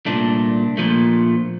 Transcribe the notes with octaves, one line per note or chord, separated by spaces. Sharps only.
C2 A#2 A3 D4
A#2 F3 A3